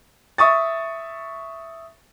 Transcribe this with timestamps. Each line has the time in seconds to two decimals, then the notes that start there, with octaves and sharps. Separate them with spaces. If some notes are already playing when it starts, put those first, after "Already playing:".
0.38 E5 C#6 D#6 A6